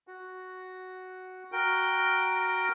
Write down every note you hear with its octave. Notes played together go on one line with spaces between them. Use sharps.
F#4
F#4 A#4 G5